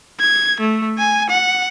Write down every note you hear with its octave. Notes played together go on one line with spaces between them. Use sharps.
G#6
A3
G#5
F#5